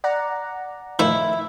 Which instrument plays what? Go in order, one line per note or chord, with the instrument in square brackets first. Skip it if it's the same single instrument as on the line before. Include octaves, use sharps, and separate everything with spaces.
[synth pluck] D5 F#5 A#5
[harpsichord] D#3 F3 A3 [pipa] E4